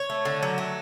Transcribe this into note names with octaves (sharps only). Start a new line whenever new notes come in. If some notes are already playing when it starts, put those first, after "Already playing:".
Already playing: C#5
A3
D3
F#3
A3